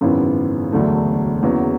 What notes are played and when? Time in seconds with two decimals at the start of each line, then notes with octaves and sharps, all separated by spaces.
0.01 G#1 F#2 C#3 E3 B3
0.72 E1 D2 D3 F#3 A3
1.43 F#1 E2 C#3 F#3 B3